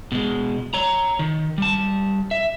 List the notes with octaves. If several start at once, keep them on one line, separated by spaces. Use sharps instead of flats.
B2 G#3
C#5 A#5
D#3
G3 A5
E5